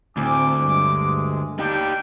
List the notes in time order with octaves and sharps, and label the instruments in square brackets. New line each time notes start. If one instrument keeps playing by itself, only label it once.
[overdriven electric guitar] D2 [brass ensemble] A2 C4 G#5 [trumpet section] D6
[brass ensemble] G2 G#3
[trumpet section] G3 D4 G5 [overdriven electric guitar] D#4 G4